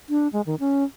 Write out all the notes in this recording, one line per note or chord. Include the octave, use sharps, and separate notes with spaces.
D4
G#3
D#3
C#4